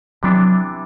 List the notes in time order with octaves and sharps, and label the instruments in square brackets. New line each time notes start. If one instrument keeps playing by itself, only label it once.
[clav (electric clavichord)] C3 E3 B3 D4 [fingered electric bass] F#3